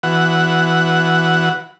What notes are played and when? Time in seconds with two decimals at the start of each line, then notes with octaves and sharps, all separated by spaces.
0.03 E3 F#4 B4 F#5